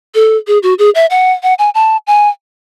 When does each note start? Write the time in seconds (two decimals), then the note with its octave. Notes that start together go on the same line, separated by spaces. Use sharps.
0.15 A4
0.47 G#4
0.63 F#4
0.79 G#4
0.95 E5
1.10 F#5
1.43 F#5
1.59 G#5
1.75 A5
2.07 G#5